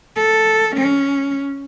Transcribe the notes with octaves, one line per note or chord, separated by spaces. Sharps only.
A4
C#4